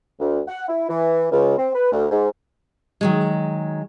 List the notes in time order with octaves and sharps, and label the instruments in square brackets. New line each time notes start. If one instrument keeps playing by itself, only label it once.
[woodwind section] D2
F#5
E4
E3
C#2
C4
B4
D2
G#2
[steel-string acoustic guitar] D#3 F#3 G#3